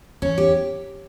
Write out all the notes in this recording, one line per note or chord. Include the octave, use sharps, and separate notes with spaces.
E2 C#4
G4